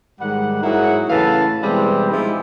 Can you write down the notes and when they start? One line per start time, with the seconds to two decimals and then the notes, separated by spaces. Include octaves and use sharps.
0.20 G#2 D#3 G3 G#3 F#5
0.63 G#2 F#3 A#3 E4 G#4 F#5
1.10 A2 C#3 E3 F5 A5
1.63 B2 E3 G3 G#3 C4
2.10 F3 G#3 C4 D#4 E4 G4